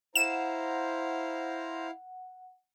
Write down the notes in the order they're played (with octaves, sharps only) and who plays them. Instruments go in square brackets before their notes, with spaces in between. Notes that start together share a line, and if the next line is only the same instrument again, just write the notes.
[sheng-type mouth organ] E4 F5 [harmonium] C5 A#5 [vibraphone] F#5 [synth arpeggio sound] E7